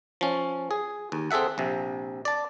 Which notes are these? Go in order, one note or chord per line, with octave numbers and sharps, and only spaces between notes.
F3 C#4
G#4
D#2
C4 G#4 A4 E5 F#5
A#1 C3
D5 A5